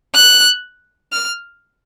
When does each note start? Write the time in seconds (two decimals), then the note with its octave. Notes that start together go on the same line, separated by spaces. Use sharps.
0.14 F#6
1.13 F6